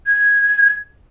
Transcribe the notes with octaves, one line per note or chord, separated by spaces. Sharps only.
G#6